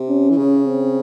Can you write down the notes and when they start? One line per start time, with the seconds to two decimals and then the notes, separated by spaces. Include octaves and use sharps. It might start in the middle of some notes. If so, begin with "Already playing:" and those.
Already playing: C3
0.09 C#4
0.30 E3
0.38 C#3
0.65 C4